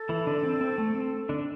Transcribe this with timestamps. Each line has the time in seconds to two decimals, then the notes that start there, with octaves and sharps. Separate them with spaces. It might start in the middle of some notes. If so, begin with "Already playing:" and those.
Already playing: A4
0.09 E3 E4
0.27 D3 D4
0.43 C4
0.61 C4
0.78 A3
0.95 C4
1.29 D3 D4